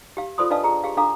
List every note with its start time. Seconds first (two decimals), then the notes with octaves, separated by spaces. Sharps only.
0.17 G4 F5
0.38 F4 A4 C5 D5 C6 D#6
0.50 D4 B4 D5 D#5 F5 A5
0.64 G#4 A#5
0.84 G4 G#4 F5
0.97 D4 A4 F5 A#5 D6